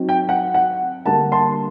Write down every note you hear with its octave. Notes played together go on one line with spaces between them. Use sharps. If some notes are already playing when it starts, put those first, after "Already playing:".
Already playing: F#3 C4 D#4
G5
F#5
F#5
D3 G3 A#3 F#5 A5
A5 C6